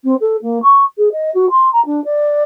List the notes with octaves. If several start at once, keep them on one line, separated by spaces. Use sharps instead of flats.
C4
A4
A#3
C#6
G#4
D#5
F#4
C6
A#5
D4
D5